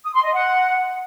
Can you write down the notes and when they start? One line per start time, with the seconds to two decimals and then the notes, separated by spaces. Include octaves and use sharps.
0.05 D#6
0.14 C6
0.23 D#5
0.33 F#5